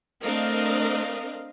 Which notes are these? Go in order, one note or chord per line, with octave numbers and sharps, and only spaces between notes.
A3 C4 D4 A#4 D#5 F5